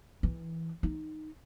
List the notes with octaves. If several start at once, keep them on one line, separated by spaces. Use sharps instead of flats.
E3
D#4